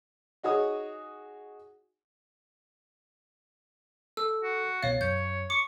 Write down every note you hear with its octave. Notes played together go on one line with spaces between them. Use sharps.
D#4 F#4 G#4 C#5 D#6
A4 E6
F#4
C2 B2 C#5 F5 A6
F#2 C#5 G6
C#6 D6